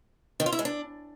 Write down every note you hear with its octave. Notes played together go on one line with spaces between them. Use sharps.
D#3
F4
E4
G#3
D4